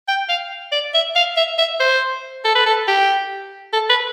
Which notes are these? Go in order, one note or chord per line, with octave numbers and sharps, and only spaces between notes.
G5
F5
D5
E5
F5
E5
E5
C5
A4
B4
A4
G4
A4
B4